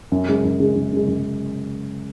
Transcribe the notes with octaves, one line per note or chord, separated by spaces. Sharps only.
F#2
C#3 G#3
F#2
C#3 G#3
F#2
C#3 G#3
F#2